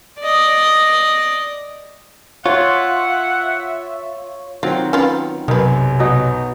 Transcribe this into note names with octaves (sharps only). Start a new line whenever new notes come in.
D5 D#5
F4 C#5 E5 F#5 C6
D#3 F#3 C4 F4
C#4 F4 B4
B1 F#2 C3 D#3 B4
B2 F#3 D#4